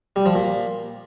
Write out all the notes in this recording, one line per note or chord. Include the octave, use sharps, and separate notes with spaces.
G3
F3
A#2